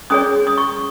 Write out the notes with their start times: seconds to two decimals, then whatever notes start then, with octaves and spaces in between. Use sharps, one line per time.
0.10 C#4 G#4 C#5 D#6
0.47 D#6
0.58 C#6